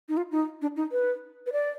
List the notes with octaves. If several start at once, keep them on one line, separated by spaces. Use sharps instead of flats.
D#4
F4
D#4
D4
D#4
B4
B4
D5